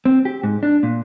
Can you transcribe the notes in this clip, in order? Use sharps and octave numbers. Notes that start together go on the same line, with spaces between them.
C4
G4
G#2
D4
A#2